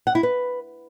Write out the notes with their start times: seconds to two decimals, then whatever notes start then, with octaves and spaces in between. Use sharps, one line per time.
0.07 F#5
0.15 E4
0.23 B4